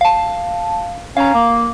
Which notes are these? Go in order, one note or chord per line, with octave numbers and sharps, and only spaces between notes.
F5 A5
C#4 F5 A#5
A#3